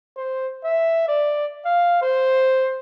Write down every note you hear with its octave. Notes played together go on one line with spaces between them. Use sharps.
C5
E5
D5
F5
C5